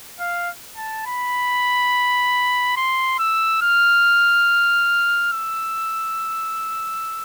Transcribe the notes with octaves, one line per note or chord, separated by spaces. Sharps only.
F5
A5
B5
C6
E6
F6
E6